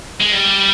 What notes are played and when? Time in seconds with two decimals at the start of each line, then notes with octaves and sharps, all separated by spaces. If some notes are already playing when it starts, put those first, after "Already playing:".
0.21 G#3
0.33 G3